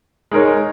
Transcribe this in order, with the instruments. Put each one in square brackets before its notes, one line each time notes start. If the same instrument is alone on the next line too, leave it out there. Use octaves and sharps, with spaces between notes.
[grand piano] G#3 D#4 A#4 C#5